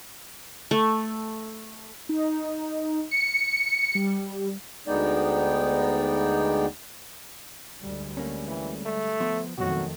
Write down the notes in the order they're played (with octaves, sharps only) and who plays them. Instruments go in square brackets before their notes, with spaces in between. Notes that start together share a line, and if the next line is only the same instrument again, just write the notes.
[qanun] A3
[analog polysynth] D#4
C#7
G3
[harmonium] D2 G#3 B3 D#4 D5 G5
[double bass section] D2 G3 G#3
[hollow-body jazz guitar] A3 A#3 C#4
[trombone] E3
A3
[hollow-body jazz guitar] F3 B3 C5
[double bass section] F2 D#3 A3 [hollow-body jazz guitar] B2 F#3 C#5 [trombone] F#4